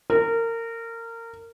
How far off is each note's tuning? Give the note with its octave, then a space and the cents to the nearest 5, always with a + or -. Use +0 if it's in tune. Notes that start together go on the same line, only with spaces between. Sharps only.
A#4 -25